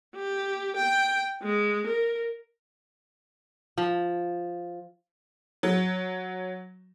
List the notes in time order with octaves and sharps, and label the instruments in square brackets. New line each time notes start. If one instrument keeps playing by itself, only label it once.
[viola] G4
G5
G#3
A#4
[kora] F3
[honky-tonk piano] F#3